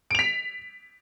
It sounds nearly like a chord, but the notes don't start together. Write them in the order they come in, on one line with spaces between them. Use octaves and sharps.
D7 F7 B6